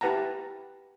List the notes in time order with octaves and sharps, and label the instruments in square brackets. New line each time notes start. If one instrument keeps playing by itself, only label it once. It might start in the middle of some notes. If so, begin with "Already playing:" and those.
[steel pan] E4 G4 B4 F#5 A5 A#5